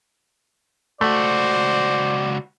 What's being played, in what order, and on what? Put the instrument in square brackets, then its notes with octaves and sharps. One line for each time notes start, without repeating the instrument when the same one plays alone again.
[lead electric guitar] C#2 F#4 [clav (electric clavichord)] A3 [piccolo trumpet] C5 [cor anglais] D5